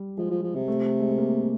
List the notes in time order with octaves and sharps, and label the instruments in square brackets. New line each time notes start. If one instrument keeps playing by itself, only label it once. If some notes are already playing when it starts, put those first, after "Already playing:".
Already playing: [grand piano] G3
[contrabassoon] F3 [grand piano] G#3
[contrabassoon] F3
F3
C3
[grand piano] A3
G#3
A3
A#3